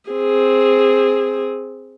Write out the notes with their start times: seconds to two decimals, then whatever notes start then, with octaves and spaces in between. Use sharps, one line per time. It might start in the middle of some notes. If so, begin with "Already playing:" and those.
0.10 C4 G#4